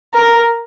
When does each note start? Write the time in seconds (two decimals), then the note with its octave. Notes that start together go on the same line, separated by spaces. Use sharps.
0.14 A#4